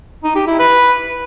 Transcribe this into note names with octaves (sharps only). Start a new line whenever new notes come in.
D#4
G4
E4
B4